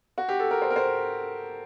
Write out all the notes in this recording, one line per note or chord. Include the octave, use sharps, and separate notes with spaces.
F#4
G4
A4
A#4
C5
A#4
C5